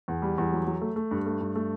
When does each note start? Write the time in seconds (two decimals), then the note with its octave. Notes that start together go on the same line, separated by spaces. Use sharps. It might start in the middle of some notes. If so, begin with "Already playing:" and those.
0.08 E2
0.22 G3
0.38 E2
0.53 F#3
0.67 F#3
0.81 A3
0.96 A3
1.11 G2
1.26 A3
1.41 G2
1.55 A3